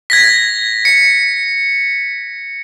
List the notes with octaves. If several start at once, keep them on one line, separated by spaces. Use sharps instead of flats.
G#6 A#6 B6
C#7